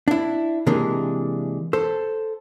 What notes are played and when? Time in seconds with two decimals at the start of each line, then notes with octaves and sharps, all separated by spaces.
0.08 D4 E4
0.66 C3 E3 G#3 A#3 D4
1.73 A4 C5